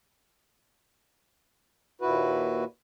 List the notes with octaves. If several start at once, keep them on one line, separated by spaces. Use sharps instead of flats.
D#2 A#2 E4 F#4 B4